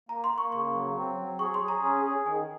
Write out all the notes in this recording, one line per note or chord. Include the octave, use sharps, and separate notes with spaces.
A#3 A#5
C6
A#3
C#6
C#3 C#6
F#3
C4
F#3
G#4 C#6
C6
G#4
A#5
C#4
G#4
D#3 G#5